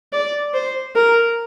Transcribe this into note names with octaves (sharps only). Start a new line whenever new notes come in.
D5
C5
A#4